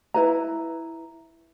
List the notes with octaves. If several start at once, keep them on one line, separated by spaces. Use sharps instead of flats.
E4 B4 A#5